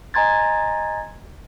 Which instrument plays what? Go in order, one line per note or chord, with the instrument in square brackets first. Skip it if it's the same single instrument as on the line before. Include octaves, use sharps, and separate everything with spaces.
[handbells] D#5 G#5 A#5 C6 G#6 A6